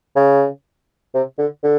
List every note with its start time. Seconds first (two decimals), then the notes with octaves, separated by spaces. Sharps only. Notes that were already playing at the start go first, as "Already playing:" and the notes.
0.16 C#3
1.14 C3
1.38 D3
1.63 D3